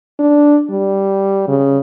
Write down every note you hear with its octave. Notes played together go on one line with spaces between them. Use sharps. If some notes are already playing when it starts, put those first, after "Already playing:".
D4
G3
C#3